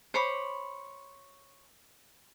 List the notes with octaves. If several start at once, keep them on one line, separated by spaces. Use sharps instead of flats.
C5 C#5 B5 D6